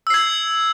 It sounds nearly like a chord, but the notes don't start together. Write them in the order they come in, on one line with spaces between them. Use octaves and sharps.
E6 C7 G#6